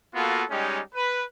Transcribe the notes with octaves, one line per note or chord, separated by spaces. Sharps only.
A#3 B3 F4 F#4 A4
G3 G#3 C#4 D#4 G4
B4